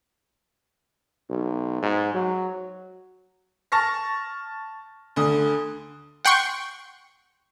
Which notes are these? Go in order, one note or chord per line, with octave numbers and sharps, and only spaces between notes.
B1
G#2
F#3
A5 C#6 F6 A#6
D2 D3 D#6
F#5 G5 C6 C#6